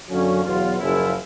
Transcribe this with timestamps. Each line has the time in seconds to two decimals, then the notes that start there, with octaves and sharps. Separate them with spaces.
0.09 F#2 D3 F#3 A#3 C#4
0.44 E2 B2 F#3 F4
0.79 F#1 F#2 C#3 F3 A#3 E4